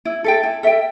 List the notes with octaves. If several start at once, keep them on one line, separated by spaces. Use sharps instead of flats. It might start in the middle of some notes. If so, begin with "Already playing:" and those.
E4
A4 E5 G5
E4
A4 E5 G5